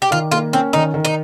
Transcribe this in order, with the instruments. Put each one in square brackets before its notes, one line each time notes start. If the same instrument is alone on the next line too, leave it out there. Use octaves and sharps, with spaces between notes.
[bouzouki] G4
[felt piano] D#3 [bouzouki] F4
[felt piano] A#3 [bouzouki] F4
[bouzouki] C4 [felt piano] C#4
[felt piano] D#3 [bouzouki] D#4
[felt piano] D#3
[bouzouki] D#4